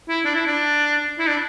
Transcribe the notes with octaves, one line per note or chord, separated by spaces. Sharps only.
E4
D4
E4
D4
E4
D4